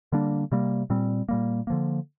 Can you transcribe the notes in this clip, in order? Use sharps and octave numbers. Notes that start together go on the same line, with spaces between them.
D3 G3 A#3 D4
C3 G3 A#3
A#2 G3 C4
A#2 G3 A#3
D3 F3 A#3